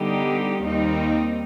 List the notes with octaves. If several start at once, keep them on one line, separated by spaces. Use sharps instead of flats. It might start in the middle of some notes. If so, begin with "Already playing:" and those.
Already playing: D3 G3 B3 D#4 G4
D#2 D#3 G3 C4 D#4